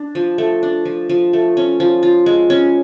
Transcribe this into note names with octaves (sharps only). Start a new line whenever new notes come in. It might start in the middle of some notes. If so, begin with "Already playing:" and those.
Already playing: D4
F3
A3
D4
F3
F3
A3
C#4
F3
F4
G#3
C#4